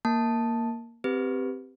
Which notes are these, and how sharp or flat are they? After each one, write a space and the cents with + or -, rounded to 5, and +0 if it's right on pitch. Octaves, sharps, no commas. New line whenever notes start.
A#3 +0 A5 +0
C4 -5 G4 +0 B4 +0